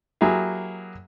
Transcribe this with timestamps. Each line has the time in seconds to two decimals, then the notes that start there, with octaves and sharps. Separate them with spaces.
0.21 F#3 A#3 E4 G4 G#4